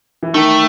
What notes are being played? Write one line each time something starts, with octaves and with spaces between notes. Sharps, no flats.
E3
D#3 A3